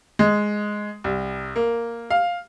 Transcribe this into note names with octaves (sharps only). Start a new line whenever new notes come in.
G#3
C2
A#3
F5